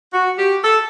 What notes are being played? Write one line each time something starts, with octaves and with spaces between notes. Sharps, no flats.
F#4
G4
A4